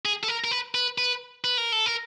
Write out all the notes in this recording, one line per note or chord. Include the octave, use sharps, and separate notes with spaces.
G#4
A4
A#4
A#4
B4
B4
B4
B4
A#4
A4
A#4